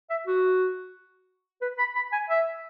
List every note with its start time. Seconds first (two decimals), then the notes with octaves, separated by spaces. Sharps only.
0.10 E5
0.27 F#4
1.62 B4
1.78 B5
1.95 B5
2.12 G#5
2.29 E5